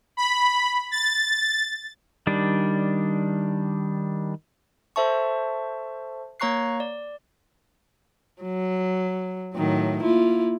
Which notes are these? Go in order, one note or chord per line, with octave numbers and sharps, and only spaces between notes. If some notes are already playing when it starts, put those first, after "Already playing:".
B5
A6
D#3 G3 D4
A4 C5 E5 A5 C#6
A#3 C#5 A#5 C#6 F#6 C7
D5
F#3
A2 D#3 F#3
A#3 E4 F4